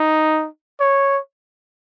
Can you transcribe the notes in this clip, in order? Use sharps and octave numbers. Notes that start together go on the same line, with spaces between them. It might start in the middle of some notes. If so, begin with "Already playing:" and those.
Already playing: D#4
C#5